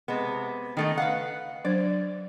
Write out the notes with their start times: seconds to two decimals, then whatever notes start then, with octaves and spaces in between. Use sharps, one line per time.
0.08 C3 G#3 B3
0.77 D#3 A3 D#4
0.98 B4 F5 F#5
1.65 F#3 D4 C5 D5